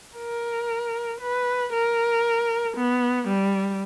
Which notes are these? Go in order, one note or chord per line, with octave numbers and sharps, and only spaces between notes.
A#4
B4
A#4
B3
G3